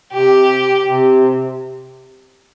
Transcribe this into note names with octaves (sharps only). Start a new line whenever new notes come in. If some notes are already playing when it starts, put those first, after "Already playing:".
C3 G4
C3